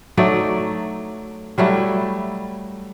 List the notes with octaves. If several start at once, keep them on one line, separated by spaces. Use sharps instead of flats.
F#3 A3 D#4 D5
F#3 G3 A3 E4